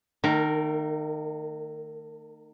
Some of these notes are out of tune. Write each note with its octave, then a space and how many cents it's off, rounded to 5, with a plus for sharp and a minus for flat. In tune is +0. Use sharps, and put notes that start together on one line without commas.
D#3 -25 A3 +35 A#4 +0